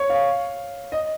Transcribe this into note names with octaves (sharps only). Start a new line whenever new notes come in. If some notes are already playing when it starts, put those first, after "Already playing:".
Already playing: C#5
F5
D#5